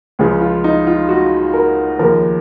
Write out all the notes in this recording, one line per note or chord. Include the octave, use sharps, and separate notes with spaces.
C#2 C#3 F3 G#4
F4
D#4
F4
F#4
A#4
D#2 C#3 F3 A#4